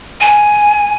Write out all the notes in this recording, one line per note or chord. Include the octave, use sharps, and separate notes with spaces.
G#5